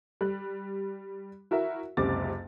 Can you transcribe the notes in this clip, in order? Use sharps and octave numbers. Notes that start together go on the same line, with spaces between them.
G3 F#6
E4 F#4 A#4 E5
F#1 C#2 C3 D6 A6